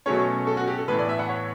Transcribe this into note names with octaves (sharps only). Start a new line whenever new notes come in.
B2 F#3 A3 C#4 C#5
A4
F#4
G4
A4
A2 E3 B3 E4 B4
D5
E5
F#5
C#5